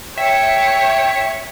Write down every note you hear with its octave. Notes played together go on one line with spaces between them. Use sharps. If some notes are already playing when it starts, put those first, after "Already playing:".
C#5 E5 G5